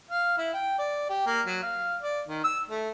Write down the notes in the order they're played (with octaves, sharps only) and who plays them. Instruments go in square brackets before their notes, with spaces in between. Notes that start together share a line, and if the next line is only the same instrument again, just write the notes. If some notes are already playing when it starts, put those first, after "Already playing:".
[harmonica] F5
E4
G5
D5
G4
A#3
F#3
F5
D5
D#3
E6
A3